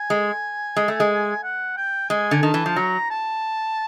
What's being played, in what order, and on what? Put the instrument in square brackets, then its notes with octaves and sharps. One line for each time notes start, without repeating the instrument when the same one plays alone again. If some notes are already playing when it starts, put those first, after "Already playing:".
Already playing: [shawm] G#5
[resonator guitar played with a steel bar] G#3
G#3
A3
G#3
[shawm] F#5
G5
[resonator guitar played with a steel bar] G#3 [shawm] G#5
[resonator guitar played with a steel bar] D3
[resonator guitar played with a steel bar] D#3 [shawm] A5
[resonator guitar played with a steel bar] E3
F3
[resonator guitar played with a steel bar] F#3 [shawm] A#5
[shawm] A5